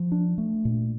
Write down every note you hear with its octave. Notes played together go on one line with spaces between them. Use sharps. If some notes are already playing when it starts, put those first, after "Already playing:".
Already playing: F3
D4
A3
A#2